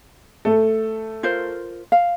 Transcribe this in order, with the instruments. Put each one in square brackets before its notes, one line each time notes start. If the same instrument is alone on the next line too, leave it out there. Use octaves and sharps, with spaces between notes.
[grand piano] A3 A4
[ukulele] F4 A#4 C5
F5